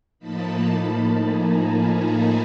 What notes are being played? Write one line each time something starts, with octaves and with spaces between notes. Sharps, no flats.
A2 F3 A#3 D#4 A5 B5
G#5 A#5